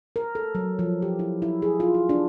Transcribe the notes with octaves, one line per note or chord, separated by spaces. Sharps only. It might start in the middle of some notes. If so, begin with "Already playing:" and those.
A#4
A4
F#3
F3
G4
E4
E4
G#4
F4
E4
D4